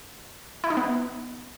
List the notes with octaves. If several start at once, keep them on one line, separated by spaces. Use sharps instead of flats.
E4
D#4
B3